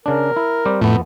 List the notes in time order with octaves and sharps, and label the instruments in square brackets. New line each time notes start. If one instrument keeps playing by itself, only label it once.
[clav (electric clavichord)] C#3 D4 [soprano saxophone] A#4
[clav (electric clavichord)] E4
G3 C4 G4
[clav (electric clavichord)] F2 B3 [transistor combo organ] A2